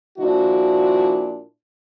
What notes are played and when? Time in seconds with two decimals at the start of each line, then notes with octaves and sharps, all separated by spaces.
0.18 A#2 F3 D4 E4 F#4